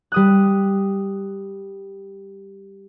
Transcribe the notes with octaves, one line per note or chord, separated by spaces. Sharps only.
G3 D#6 F#6